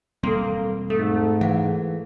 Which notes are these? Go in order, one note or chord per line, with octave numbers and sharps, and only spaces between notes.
E1 G3 A#3 C4 A4 C6
G#2 A3 A4
E3 F5 F#5